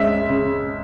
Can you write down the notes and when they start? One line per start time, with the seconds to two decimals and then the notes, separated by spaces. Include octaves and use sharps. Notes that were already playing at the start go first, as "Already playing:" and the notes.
Already playing: C#2 G#3 C#4 E5
0.29 C#3